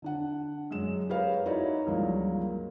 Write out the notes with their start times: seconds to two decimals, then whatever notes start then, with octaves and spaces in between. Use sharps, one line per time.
0.02 D3 D4 F#5
0.71 F#2 G#3 E7
1.09 G4 G#4 A#4 B4 C#5 F5
1.46 D#4 E4 F#4 C#5 D5
1.86 C#2 G2 F3 F#3 A#3